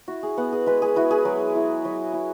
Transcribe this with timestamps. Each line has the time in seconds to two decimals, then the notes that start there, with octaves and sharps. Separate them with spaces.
0.08 E4 F#4
0.23 G#4
0.37 B3 F#5
0.52 G#4
0.67 G#3 B4
0.82 G#4
0.96 E4 F#4
1.11 G#4
1.25 F#3
1.55 E4
1.85 F#3
2.13 E4